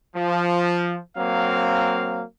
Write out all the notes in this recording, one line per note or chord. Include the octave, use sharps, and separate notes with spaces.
F3
F#3 A#3 C4 F5